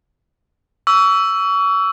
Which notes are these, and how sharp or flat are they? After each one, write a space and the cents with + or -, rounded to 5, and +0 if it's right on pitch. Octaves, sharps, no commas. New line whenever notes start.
C#6 +35 E6 +5